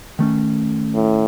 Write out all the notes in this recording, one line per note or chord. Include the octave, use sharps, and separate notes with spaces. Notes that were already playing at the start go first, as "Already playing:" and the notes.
D#3 A3 C#4
A2